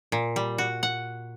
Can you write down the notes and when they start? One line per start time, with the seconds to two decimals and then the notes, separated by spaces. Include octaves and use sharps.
0.12 A#2
0.36 G3
0.58 F#4
0.83 F#5